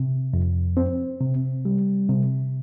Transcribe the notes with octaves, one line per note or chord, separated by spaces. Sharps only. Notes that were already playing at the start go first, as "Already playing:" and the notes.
Already playing: C3
F2
C4
C3
G3
C3